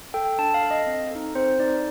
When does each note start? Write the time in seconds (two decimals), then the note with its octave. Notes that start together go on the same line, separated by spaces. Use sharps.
0.14 A4 G5
0.39 D4 A5
0.54 F5
0.63 A4
0.71 D#5
0.86 C4
1.11 D#4 A4
1.35 C4 C5
1.60 D#4 A4 D5